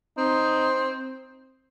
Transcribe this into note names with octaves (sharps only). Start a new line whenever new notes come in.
C4 D#4